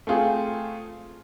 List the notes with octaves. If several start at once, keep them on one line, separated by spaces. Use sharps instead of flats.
A3 C4 F4 G#4